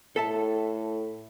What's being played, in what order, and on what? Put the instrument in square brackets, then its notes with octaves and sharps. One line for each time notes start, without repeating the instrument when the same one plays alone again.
[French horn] A2 [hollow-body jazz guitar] A4 E5 A5